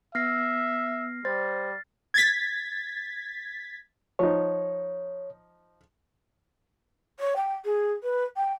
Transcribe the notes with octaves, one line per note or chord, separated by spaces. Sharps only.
B3 E5 F6 A#6 C7
G3 C5 A6
G#6 A6 B6
F3 D#4 C#5
C#5
G5
G#4
B4
G5